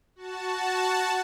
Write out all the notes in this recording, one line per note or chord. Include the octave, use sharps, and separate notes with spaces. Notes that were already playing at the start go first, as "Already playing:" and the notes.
F#4 A5